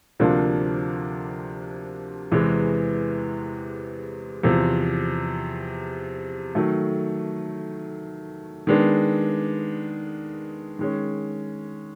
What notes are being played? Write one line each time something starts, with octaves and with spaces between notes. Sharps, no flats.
D2 C3 F3 A#3 D4
E2 C3 E3 G#3 B3
E2 C3 F3
D#3 F#3 A3
D#3 G#3 B3 D4
D#3 G#3 C#4